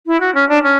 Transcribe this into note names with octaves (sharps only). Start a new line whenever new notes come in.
E4
F#4
C#4
D4
C#4